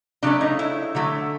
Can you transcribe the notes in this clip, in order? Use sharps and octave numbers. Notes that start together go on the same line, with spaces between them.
C#3 F#3 A3 D4
D#4
E4
D3 F#3 A3